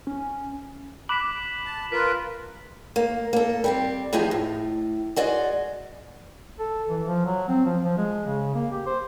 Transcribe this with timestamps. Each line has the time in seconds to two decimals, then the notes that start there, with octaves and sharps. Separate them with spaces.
0.07 C#4
1.09 B5 D6 F#6 B6 E7 F#7
1.66 A5
1.92 F4 A#4 B4 B6
2.96 A#3
3.33 A#3 A4
3.64 G3 C4 G4
4.13 E2 F3 D#4 G4 G#4
4.31 A2
5.16 G#3 F#4 D5 D#5
6.59 A4
6.89 E3
7.06 F3
7.25 F#3
7.48 C4
7.66 F3
7.84 F3
7.98 G#3
8.27 C#3
8.55 A#3
8.71 G4
8.87 C5